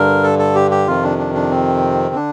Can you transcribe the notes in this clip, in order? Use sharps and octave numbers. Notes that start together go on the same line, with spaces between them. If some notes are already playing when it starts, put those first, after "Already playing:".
Already playing: G2 D3 A#4
A4
A4
G4
G4
F2 C3 D#3 F4
D4
D4
D4
C4
D3 D4